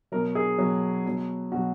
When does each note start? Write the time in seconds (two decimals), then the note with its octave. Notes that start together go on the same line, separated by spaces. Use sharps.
0.12 B2 F#3 A#4
0.35 G#4
0.58 B2 F#3
1.05 B2 F#3
1.51 B2 F#4
1.55 F#3